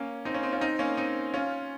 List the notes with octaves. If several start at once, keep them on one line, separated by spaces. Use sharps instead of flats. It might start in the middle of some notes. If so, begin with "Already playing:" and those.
Already playing: A#3 C#4
C4 D#4
A#3 C#4
C4 D#4
C#4 F4
C4 D#4
A#3 C#4
C4 D#4
C#4 F4